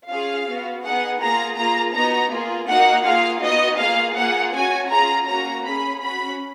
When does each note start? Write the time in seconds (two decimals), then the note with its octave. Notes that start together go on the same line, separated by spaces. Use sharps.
0.09 C#4 F4 G#4 F5
0.46 B3 F#4
0.83 B3 D#4 G#4 F#5
1.21 A#3 F4 G#4 A#5
1.57 A#3 F4 G#4 A#5
1.94 B3 D#4 F#4 A#5
2.31 A#3 F4 G#4
2.68 A#3 D#4 F#4 F#5
3.06 A#3 F4 G#4 F5
3.43 B3 D#4 F#4 D#5
3.79 A#3 F4 G#4 F5
4.16 A#3 F4 G#4 F#5
4.54 C#4 F#4 G#5
4.91 C#4 F4 G#4 A#5
5.28 A#3 C#4 F#4 A#5
5.65 C#4 G#4 B5
6.02 C#4 F#4 B5